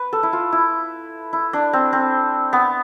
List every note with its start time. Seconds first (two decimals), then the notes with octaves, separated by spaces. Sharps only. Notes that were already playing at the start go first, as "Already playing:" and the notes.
Already playing: B4
0.13 A4
0.23 E4
0.33 F4
0.52 E4
1.33 E4
1.53 D4
1.73 C4
1.93 C4
2.53 B3